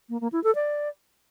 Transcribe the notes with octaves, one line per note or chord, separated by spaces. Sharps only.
A#3
A#3
E4
A4
D5